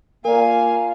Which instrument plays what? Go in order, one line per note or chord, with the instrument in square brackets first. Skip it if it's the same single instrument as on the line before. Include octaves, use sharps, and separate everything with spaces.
[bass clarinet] A#3 [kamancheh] F4 F5 [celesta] A#4 D5 [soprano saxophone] G#5